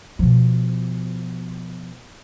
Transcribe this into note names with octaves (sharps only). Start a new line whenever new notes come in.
B2 F3